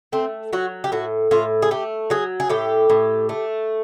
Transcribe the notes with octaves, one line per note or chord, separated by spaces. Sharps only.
A3 C4
F#3 F#4
G4
A2 F#4
A2 F4
G#4
A3 G4
F#3 G#4
G#4
A2 G4
A2
A3